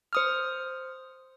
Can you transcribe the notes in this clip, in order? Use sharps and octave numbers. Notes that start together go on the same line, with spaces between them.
C5 D#6 F6